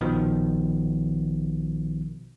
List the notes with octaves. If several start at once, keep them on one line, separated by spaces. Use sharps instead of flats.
A#1 B2 D#3 F3